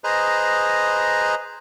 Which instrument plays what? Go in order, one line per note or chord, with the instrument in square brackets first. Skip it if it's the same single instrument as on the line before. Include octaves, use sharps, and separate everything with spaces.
[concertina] G#4 B4 C5 D#5 A#5